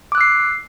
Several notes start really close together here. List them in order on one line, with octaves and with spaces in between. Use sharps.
D6 F#6 E6 C7